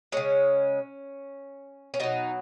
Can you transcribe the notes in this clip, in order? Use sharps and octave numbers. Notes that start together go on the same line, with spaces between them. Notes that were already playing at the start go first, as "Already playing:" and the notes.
C#3 G#3 C#4
C#4
B2 F#3 D#4